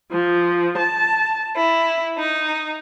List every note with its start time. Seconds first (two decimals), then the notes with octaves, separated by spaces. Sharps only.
0.11 F3
0.77 A5
1.56 E4
2.17 D#4